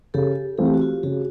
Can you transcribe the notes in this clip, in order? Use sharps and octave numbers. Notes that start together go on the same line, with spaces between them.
C#3 G4 A4
E3 A3 C4 F4 G#4
G4
F#4
F4 G4
C#3 F#4 G#4